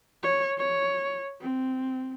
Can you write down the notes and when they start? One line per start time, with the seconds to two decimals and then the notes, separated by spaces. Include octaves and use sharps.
0.23 C#5
0.58 C#5
1.41 C4